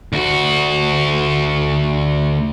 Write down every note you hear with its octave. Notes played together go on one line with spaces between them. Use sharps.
D2 F#4